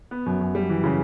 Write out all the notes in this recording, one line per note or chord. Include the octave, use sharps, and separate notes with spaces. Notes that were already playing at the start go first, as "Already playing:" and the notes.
B3
F#2
F#2
G3
E3
C#3